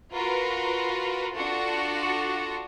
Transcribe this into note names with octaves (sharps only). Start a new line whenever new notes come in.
F4 F#4 A#4 B4
D4 F4 F#4 A4